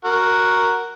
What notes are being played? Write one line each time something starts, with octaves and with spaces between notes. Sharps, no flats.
F#4 A#4